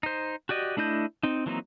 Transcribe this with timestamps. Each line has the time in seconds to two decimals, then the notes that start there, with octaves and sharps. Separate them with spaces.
0.03 D#4 C5
0.49 F#4 G4 D5 D#5
0.77 A3 D4 E4 D#5 G6
1.23 C4 D#4
1.46 E3 F#3 A#3 C4 D#4